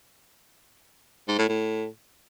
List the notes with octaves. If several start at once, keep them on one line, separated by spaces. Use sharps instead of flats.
G#2
A2
A2